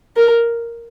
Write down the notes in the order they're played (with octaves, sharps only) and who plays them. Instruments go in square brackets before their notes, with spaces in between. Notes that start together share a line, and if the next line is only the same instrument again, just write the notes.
[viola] A#4